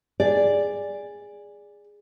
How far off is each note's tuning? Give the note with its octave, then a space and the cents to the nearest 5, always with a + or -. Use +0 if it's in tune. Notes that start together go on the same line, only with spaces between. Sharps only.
G#4 -15 D5 +0